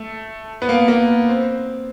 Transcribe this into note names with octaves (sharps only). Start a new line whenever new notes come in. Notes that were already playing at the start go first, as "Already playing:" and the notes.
Already playing: A3
B3
A#3
A#3
C4